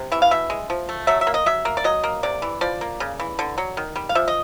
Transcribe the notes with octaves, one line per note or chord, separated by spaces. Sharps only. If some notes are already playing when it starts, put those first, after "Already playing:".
Already playing: C3
E3 E5
F5
B2 E5
G#3
F3
A3
F#3 E5
E5
A#3
D#5
F#3 E5
A#3
D5
F#3 D#5
A#3
C3 D5
E3
F3 D5
A#3
C#3
E3
D3
F#3
D#3
G3
F5
F3 E5
D#5